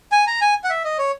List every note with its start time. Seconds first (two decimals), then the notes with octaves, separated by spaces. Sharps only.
0.12 G#5
0.27 A#5
0.41 G#5
0.64 F#5
0.70 E5
0.84 D#5
0.98 C#5